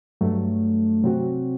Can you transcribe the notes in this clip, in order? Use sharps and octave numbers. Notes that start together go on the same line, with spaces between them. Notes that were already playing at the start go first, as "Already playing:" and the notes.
G2 F#3 A3
C3 F#3 C4 F#4